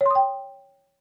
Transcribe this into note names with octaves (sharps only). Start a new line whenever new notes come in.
C#5 G5 C6 D#6